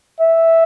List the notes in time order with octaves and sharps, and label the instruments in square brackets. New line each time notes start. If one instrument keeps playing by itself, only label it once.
[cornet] E5